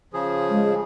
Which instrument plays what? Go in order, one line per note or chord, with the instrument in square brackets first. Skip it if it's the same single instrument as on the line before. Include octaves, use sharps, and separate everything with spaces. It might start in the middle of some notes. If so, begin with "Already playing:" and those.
[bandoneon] C#3 F3 G#4
[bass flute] G#3